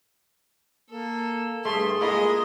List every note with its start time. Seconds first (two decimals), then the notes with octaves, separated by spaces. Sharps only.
0.90 A#3 A4
1.65 G2 A3 G#4 A4 E5 C6
2.01 G#3 A#3 E4 F4 D#5